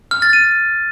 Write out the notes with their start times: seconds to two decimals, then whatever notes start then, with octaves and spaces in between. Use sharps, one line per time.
0.11 F6
0.22 A6
0.33 D#7